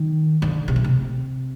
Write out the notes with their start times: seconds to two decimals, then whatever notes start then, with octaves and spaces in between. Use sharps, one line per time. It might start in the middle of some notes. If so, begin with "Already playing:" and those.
Already playing: D#3
0.42 D3
0.68 C3
0.76 B2
0.84 C3